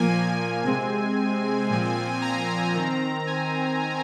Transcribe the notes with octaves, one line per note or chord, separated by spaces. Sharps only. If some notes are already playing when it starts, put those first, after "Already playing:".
Already playing: A#2 F3 A#3 G#5
C3 G#3 C4 G#5
A#2 F3 C4
A#5
D#3 C4
G#5